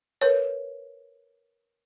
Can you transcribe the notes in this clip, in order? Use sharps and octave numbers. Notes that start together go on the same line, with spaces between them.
A#4 B4 C#5